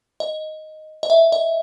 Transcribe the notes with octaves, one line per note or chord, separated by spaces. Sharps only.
D#5
D#5
E5
D#5